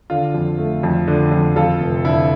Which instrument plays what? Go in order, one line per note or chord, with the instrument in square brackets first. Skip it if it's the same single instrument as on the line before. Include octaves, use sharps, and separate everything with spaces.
[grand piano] D3 F4
F2
A3
F2
D3
F2
F2 F4 A4
F1
D3 E4